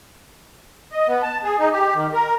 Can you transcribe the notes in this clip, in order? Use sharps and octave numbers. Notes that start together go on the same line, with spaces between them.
D#5
B3
A5
G#4
D#4
G4
D#3
A#4